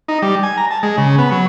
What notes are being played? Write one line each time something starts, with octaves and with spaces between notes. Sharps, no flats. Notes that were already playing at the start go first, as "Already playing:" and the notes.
D#4
G3
G#5
A#5
A5
G#3
C#3
B3
F#3